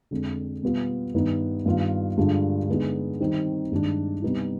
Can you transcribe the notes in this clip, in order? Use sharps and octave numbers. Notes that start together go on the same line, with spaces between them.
F2 D3 G#3
B2 G3 B3 F4
G2 D#3 B3 D#4
G2 D#3 B3 F4
G2 D3 G#3 D4 F4
D3 G#3 B3 D#4
D#3 G3 C4 D#4
G2 D#3 G#3 D4
C3 G3 B3 D#4